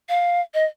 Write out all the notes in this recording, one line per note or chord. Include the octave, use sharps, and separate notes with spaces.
F5
D#5